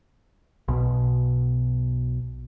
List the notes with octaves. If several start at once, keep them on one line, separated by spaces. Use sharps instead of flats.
B1 B2